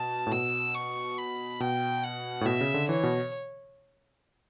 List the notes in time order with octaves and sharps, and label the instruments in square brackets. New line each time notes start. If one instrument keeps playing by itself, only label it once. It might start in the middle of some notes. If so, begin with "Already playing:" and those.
Already playing: [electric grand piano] B2 [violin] A5
[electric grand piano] A2
[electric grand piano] B2 [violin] E6
[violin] C#6
B5
[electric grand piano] B2 [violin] G5
[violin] F#5
[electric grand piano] A2
[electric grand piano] B2 [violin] E5
[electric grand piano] C#3
D3
[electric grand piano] E3 [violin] C#5
[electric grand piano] B2